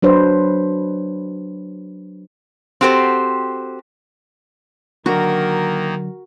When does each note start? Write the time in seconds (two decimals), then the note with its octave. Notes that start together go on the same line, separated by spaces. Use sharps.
0.02 F#3 D4 B4 C5
2.81 C4 F#4 G4 A4 C5
5.06 D3 D#3 F#3 A#3 F#4 A#4